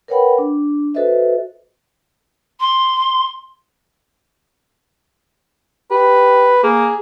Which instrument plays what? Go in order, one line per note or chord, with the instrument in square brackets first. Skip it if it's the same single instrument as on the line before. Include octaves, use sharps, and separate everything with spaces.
[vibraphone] A#4 B4 C#5 F#5 G5 B5
D4
F#4 A4 B4 C5 D#5 E5
[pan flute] C6
[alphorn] G4 [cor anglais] B4
[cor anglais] A#3 [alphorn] G#4